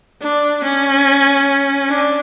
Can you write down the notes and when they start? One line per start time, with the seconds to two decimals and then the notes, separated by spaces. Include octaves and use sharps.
0.22 D4
0.64 C#4
1.89 D4